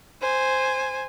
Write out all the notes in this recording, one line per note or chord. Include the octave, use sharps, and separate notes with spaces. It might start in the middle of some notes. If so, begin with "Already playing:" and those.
C5 G#5